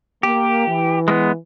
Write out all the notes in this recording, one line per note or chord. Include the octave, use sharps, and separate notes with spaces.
A#3 G4
E3
G#3 A#3 B3